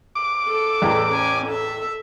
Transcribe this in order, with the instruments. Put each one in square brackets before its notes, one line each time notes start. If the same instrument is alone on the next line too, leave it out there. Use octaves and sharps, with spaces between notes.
[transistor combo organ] D6
[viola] A4
[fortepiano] A1 E2
[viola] C#4 G#5
A4 E5